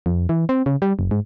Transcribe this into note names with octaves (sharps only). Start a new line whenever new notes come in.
F2
E3
C4
C#3
G3
F#1
G#2